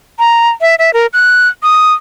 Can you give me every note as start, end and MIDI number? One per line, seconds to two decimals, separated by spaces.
0.19 0.49 82
0.61 0.75 76
0.79 0.93 76
0.93 1.07 70
1.13 1.48 90
1.63 1.93 87